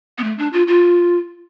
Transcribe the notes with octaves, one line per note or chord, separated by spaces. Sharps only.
B3
A3
D4
F4
F4